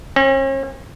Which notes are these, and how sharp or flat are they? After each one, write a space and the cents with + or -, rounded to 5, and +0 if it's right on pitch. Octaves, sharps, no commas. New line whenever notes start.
C#4 -45